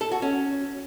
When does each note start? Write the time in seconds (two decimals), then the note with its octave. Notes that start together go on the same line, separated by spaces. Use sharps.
0.01 A4
0.12 F#4
0.22 C#4